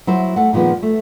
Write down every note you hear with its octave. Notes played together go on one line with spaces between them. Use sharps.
F#3 E4 C5
A3 F#5
A#2 D#3 F3 G#3 B3
A3